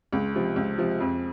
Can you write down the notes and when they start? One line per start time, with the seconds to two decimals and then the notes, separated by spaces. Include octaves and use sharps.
0.13 C#2
0.34 C3 F3
0.56 C#2
0.78 C3 F3
1.00 F2